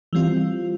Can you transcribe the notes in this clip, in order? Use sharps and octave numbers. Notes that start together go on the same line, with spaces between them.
E3 G3 C4 F4